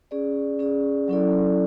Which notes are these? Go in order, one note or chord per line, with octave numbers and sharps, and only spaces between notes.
C#4 G#4 D5
C#4 G#4 D5
F#3 C#4 E4 A4 D5